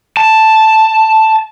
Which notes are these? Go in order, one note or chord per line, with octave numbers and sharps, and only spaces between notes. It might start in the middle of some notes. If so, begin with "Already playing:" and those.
A5